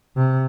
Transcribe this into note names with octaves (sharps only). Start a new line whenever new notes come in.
C3